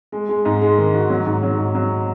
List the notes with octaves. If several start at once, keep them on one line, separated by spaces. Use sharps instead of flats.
G#3
G#3
G#2
G#3
D#3
F#4
F#3
G#2
F#3
G#2
F#3